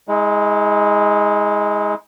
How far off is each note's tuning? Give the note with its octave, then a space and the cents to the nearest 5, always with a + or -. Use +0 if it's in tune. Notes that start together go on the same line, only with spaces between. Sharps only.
G#3 +0 E4 -45